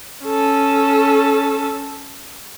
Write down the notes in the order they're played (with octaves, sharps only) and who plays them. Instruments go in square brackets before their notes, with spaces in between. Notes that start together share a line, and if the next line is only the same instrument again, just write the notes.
[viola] C#4 A4